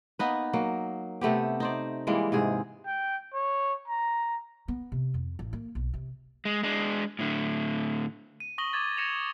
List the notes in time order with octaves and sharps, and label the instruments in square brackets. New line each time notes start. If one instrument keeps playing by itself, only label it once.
[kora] A#3 B3 D#4 B4
F#3 A#3
C3 A3 B3 G4
D#4 C5 D5
E3 G3 G#3 A#3
G#2 C3 G#4
[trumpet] G5
C#5
A#5
[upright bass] B3
C3
F2
A1
A#3
B1
C3
[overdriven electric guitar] G#3
G#3 D4
A2 D3
[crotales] D#7
C#6 D#6 A#6 F#7 G7
D6 G#6 A6
G#6 A#6 C#7 E7 F7